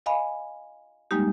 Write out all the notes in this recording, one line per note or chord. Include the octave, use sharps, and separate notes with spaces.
D#5 F5 G#5 B5
G3 G#3 A#3 D#4 G4